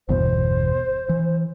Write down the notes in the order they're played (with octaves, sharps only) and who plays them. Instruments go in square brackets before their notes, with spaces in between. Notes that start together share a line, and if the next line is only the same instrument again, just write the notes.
[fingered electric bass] G1 E2 B2 [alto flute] C5
[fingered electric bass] E3